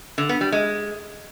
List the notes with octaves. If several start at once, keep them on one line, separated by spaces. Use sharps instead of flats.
D3
B3
G3
G#3